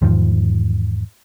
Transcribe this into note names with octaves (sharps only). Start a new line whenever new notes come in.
E2 G#2 D#3 F3